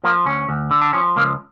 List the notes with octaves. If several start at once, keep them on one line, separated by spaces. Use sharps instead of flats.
F3 A#3
D2 C#4
D2
D3
D4
F3 C#4
C#2 A#3